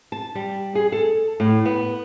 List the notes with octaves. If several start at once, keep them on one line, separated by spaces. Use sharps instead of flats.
A5
G3
G#4
A4
A2
B3